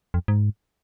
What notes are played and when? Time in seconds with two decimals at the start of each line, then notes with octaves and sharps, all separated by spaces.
0.14 F2
0.28 G#2